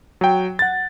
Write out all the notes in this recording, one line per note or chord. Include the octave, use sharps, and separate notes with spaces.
F#3 G5
F#5 A6